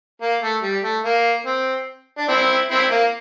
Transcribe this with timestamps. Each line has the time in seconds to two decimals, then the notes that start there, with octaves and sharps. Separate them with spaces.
0.22 A#3
0.42 A3
0.63 G3
0.84 A3
1.04 A#3
1.46 C4
2.18 D4
2.28 C4 E4
2.71 C4 E4
2.91 A#3